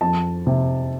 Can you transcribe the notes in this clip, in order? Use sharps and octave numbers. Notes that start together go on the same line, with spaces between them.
F2 A5
C3